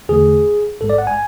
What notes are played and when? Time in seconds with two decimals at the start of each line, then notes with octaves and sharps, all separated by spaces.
0.09 E2 D3 A3 G#4
0.80 A1 G#2 G#3 A4
0.90 D5
0.98 F#5
1.07 G#5